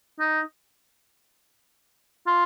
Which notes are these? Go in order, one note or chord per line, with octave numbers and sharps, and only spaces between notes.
D#4
F4